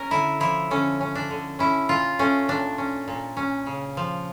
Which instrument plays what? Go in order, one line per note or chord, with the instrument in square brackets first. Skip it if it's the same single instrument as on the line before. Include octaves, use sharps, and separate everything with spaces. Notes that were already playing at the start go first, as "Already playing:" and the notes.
Already playing: [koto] C#4 A#4
D3 E4
F3 E4
D3 C#4
C#4
D4
D3
C#4 E4
A#2 F4
A3 C#4
A#2 D4
C#4
A#2
C#4
C#3
F3